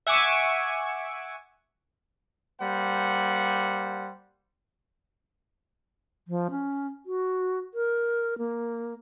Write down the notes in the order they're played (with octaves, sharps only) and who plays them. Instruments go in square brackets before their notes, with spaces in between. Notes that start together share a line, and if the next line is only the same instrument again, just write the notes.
[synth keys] E5 F#5 G#5 C#6 D6 E6
[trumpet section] G3 A#3 C5 F#5
[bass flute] F3
C#4
F#4
A#4
A#3